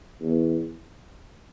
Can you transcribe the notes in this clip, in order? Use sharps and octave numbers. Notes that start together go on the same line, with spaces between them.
E2